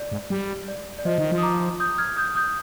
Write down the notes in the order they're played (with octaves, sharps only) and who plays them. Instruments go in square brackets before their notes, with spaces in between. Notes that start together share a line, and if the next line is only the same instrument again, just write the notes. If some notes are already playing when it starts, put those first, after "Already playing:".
Already playing: [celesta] D5
[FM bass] G#2
G3
[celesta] D5
D5
[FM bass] F3 [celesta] C5 D#5
[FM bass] D#3
F3
[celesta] D#6
A#5 D6
D#6 G6
F6 G#6
D#6 G6
D#6 G6